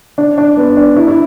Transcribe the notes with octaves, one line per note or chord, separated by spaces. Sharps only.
D4
D4
B3
D4
E4
E4